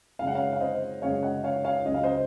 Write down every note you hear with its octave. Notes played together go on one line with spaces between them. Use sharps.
F#2 C#3 G#3 F5
F#5
C#5 F5
F5
C5 D#5
F#2 C#3 G#3 C#5 F5
D#5 F#5
C#5 F5
C#5 F5
C#2 C#3 F#3 D#5
F5
C5 D#5